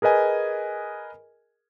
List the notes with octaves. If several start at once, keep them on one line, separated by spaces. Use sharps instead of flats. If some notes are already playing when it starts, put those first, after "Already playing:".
G#4 A#4 B4 D#5 G#5